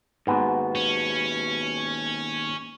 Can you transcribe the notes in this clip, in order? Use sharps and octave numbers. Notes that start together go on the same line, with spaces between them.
D#2 G#2 B2 B3
C#4